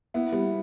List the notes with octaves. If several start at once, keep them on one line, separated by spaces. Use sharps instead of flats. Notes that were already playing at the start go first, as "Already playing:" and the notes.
B3 E4
G3 B3